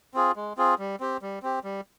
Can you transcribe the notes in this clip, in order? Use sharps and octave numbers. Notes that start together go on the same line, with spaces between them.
C4 F4 G#4
G#3
C4 F4 G#4
G3
C4 G4
G3
C4 G4
G3